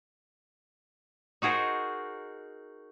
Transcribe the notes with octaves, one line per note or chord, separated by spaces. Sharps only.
D#4 F#4 G#4 A#4 C5